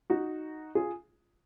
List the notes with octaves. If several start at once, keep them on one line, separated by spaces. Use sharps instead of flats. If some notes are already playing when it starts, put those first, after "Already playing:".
D#4 F#4
F4 G#4